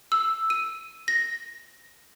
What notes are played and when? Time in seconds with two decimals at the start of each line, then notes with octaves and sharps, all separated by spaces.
0.12 E6
0.50 D#7
1.08 A#6